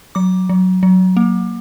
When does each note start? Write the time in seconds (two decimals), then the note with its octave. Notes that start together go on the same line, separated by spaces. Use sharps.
0.15 F#3 D6
0.49 F#3
0.83 F#3
1.17 A#3